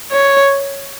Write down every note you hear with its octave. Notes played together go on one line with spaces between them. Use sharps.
C#5